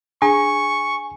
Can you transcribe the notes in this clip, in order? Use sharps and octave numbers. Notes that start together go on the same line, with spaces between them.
D4 G#4 G#5 C#6